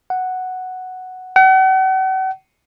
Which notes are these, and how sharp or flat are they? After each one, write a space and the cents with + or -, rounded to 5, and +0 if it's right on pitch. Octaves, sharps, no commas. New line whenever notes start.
F#5 +0
F#5 +40